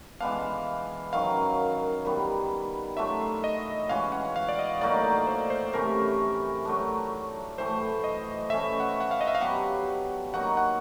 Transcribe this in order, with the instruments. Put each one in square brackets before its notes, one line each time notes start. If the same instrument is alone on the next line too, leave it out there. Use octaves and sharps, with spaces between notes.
[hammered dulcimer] E3 G#3 B3 D4 [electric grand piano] F5
[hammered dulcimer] F#2 D#3 F#3 [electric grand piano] F5
[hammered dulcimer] D#3 G3 B3
[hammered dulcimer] F#3 A3 D4 F4 [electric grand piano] E5
[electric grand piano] D#5
[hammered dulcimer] E3 G#3 C#4 F#4 [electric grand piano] F5
[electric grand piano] F#5
F5
D5
D#5
[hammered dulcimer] A2 F#3 A#3 D#4 [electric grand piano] D5
[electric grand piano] D5
C5
C5
[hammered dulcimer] C3 E3 A3 C#4 [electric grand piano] A#4
[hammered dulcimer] F#3 A3 D4
[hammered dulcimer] A2 E3 A3 [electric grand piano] C5
[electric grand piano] D#5
[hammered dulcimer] E3 A3 C#4 [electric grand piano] E5
[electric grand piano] F#5
F#5
F5
D#5
E5
F5
[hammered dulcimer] F#3 B3 D4 G4 [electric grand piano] F#5
[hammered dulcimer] F#3 A#3 D#4 F#4 [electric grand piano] F#5
[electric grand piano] F#5